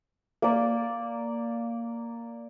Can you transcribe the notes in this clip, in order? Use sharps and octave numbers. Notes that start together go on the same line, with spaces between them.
A#3 D5